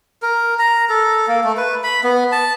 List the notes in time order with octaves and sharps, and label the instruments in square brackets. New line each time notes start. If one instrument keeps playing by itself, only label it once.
[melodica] A#4
A#5
A4
A#3
A3
B4
B5
B3
A5